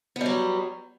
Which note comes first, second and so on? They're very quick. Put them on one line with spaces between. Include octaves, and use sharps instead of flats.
B3 G3 F#3